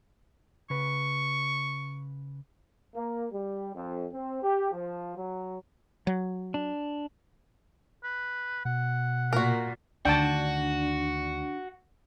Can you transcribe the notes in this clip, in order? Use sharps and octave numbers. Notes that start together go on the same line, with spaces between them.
C#3 B4 C#6
A#3
G3
F2
C4
G4
F3
F#3
F#3
D4
B4
B2 F#5
A#2 F#4 A#4
D2 D#3 D4 F#4 G5 A5